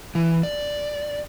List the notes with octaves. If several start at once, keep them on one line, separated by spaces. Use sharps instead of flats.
E3
D5